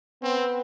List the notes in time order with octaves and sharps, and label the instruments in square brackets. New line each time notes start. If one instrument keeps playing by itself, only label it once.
[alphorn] B3 [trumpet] C4